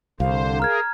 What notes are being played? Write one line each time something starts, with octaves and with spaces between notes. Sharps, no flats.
C2 D3 C5 F5
G#4 A#4 A#5 F6 G#6